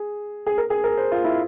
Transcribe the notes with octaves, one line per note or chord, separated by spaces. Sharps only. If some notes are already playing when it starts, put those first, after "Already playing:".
Already playing: G#4
G#4
A#4
G#4
A#4
C5
F4
E4